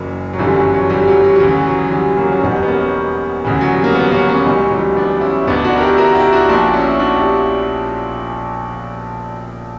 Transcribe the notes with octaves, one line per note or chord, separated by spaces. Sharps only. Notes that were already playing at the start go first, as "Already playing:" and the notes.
Already playing: F#1 F#2 E3 F#3 A#3
F#3
G1 F#2 D3 E3 G3
F#3
F#3
E3 G3
G3
F#3
F#3
F#3
D2 C#3 E3
F#3
E3 G3
F#3 A#3
C#4
E1 E2 B2 G3 B3
B3
A#3 C#4
D2 C#3 E3
F#3
G3
A#3
G3 B3
A#3 C#4
A#3 C#4
C#2 B2 E3 G3
F#3
E3 G3
B3 D4
C#4 E4
E1 D2 D3 B3 D4
D4 F#4
A#4
E4 G4
F#4 A#4
E4 G4
D4 F#4
A#1 A#2 D4 F#4
C#4 E4
D4 F#4
E4 G4